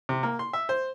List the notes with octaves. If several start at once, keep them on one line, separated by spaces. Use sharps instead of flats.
C3
A#3
C6
E5
C5